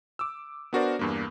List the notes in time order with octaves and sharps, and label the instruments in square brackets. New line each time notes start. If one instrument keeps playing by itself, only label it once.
[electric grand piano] D6 E6
B3 D4 F#4 A#4 C5 D5
E2 G2 A#3